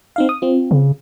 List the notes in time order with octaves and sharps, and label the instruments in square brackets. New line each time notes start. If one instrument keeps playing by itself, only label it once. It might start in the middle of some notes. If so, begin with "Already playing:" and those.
[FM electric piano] C4 D#4 F5
D#6
C4 F4
[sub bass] C#3